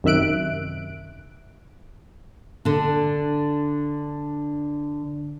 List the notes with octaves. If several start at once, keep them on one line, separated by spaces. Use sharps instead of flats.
F#2 C3 D#3 E5 F#6 D7
D3 D4